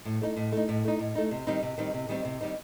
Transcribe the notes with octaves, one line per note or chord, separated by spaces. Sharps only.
A2
A3 D#4
A2
A3 D#4
A2
A3 D#4
A2
A3 D#4
C3
D#3 G3 C4 D#4
C3
D#3 G3 C4 D#4
C3
D#3 G3 C4 D#4
C3
D#3 G3 C4 D#4